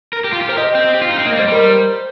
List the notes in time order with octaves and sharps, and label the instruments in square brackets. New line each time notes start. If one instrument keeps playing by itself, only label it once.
[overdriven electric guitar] A#4
G4
F4
G4
[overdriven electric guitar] A#4 [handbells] C5
[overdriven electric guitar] G4 [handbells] D#5
[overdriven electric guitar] C4
G4
F4
D#4
C4
[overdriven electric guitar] A#3 [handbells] D#5
[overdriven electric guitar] G3 [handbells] C5
[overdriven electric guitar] G3 [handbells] A#4
[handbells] C5